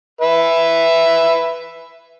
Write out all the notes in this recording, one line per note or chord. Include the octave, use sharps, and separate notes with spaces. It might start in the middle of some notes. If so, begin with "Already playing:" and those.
B4 E5